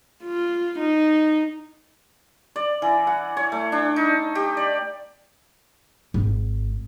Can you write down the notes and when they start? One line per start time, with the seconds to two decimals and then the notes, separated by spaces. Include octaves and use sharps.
0.24 F4
0.79 D#4
2.56 D5
2.82 E3
3.07 F#5
3.37 C#5
3.52 A3
3.72 D4
3.96 D#4
4.35 G4
4.57 D5
6.14 G#1